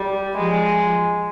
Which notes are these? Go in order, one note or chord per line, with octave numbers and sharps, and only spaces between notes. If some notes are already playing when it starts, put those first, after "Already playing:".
Already playing: G3
F3 G#3